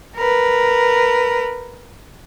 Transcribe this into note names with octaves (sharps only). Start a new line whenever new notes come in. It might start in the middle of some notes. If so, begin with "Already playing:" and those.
A#4 B4